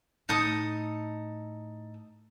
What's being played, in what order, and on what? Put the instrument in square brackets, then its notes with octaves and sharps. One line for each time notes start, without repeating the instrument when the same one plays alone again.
[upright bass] A2 [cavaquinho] D#4 A4 D#6